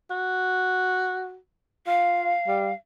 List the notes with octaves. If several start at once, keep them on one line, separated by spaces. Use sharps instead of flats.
F#4
F4 F5
G3